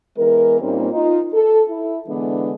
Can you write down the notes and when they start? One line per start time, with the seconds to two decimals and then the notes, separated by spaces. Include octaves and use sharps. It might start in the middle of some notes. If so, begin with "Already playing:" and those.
0.17 E3 G#3 B3 A#4
0.61 A#2 G3 A#3 C4 C#4 D#4
0.91 D#4 F4
1.34 A4
1.68 E4
2.07 D3 E3 G#3 B3 D4